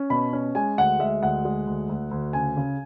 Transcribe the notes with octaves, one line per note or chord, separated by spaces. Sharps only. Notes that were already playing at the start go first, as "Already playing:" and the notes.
Already playing: C#4
B2 B5
C#4
G#3 G#5
D2 F#5
G#3 E5
D2 F#5
G#3
D2
D2
D2
C#3 G#5
C#3